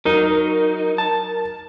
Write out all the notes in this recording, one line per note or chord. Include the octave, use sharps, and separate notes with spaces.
F#3 D#4 A#4
A5